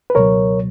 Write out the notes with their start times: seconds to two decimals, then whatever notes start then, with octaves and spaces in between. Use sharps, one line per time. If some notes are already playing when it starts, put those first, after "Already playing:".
0.10 B4
0.15 C#2 B2 F#3 A#4 C#5